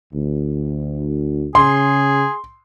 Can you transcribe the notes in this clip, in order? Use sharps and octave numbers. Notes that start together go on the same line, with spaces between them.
D2
C#3 G#4 C6